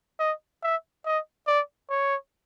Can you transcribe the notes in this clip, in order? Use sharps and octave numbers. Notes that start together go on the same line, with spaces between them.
D#5
E5
D#5
D5
C#5